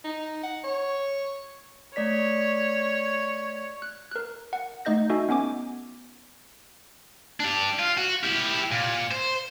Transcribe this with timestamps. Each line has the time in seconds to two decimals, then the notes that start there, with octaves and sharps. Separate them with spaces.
0.04 D#4
0.43 F#5
0.64 C#5
1.96 A3 C#5 D5 B6
3.82 F#6
4.11 A#4 F#6
4.53 F#5
4.85 A3 D#4 D#5 G6 A#6
5.10 D#4 F#4 A4 D#5 E5 G#5
5.29 B3 C#4 G#5 D6
7.40 D4 G4
7.79 F4
7.98 F#4
8.23 E4 G4
8.71 A#2
9.11 C5